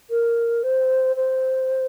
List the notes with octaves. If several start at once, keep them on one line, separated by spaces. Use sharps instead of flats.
A#4
C5
C5